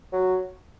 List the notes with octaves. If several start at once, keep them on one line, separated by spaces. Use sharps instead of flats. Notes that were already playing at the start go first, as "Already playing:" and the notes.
F#3